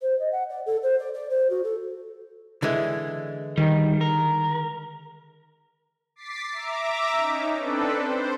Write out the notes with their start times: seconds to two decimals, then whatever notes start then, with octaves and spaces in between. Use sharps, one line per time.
0.01 C5
0.19 D#5
0.32 F#5
0.49 D5
0.66 A4
0.82 C5
0.99 D5
1.14 D5
1.30 C5
1.50 F#4
1.64 A4
2.62 D3 E3 G#3
3.58 D#3 G3
4.01 A#4
6.16 D6 A6 B6 C7
6.52 E5 A#5 D6
7.17 C#4 D#4
7.56 C4 D4 A4 B4
7.91 C5